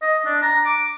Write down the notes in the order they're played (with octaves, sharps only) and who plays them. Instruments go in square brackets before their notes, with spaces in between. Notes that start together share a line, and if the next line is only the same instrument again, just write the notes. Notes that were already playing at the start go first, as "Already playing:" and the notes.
[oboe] D#5
D4
A#5
D6